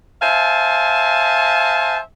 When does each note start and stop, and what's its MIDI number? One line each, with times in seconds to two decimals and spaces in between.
0.22 1.99 72
0.22 1.99 76
0.22 1.99 77
0.22 1.99 80
0.22 1.99 81